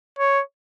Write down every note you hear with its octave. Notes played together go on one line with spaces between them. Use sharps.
C#5